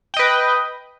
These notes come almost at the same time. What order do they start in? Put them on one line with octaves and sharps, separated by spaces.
G5 D#5 B4